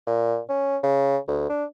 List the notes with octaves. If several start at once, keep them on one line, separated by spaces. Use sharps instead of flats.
A#2
C#4
C#3
D2
D4